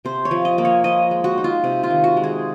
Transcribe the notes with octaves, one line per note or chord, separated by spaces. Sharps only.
C3 C5
C#5
F3
D#5
A#3
C#5
F3 D#5
G#3
F#4
D#4
F4
C3
F4
D#3
F#4
G#3
G#4